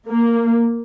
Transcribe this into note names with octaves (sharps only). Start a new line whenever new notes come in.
A#3